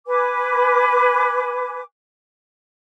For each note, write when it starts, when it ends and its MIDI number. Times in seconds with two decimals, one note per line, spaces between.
0.07 1.82 71
0.07 1.82 80
0.07 1.82 86